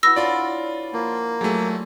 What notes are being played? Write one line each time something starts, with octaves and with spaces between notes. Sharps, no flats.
E4 F#4 B4 E6 A#6
D4 F4 C#5 D5
F3 A#3 C5
F#3 A3 G#4 D6